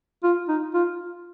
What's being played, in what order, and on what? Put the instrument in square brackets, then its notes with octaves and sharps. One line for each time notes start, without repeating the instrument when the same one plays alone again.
[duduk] F4
D#4
F4